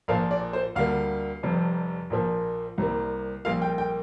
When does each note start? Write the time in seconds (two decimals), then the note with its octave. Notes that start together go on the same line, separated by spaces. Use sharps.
0.08 A#1 A#2 F3 A#3 F5
0.31 D5
0.53 C5
0.75 D2 D3 G3 A#3 F5
1.43 F1 F2 C3 G3
2.10 A#1 A#2 F3 A#3
2.78 C2 C3 G3 A#3
3.45 A#1 A#2 G3 A#3 F5
3.62 G5
3.78 G5